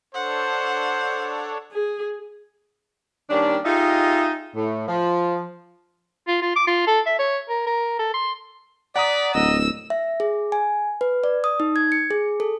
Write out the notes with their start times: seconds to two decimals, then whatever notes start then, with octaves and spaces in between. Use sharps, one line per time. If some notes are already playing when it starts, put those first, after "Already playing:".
0.14 D4 A4 C5 C#5 F#5
1.72 G#4
3.30 D#3 G3 A#3 C#4 D4
3.65 D#4 F4 G4 G#4 D#5 E5
4.56 A2
4.88 F3
6.28 F4
6.42 F4
6.56 D6
6.67 F4
6.87 A4
7.06 E5
7.19 C#5
7.49 A#4
7.67 A#4
8.00 A4
8.14 C6
8.96 D5 F#5 A#5 D#6 B6
9.34 D1 D#5 E6
9.90 E5
10.20 G#4
10.52 G#5
11.01 B4
11.24 D5
11.44 D#6
11.60 D#4
11.76 G#6
11.92 C#7
12.11 G#4
12.40 A4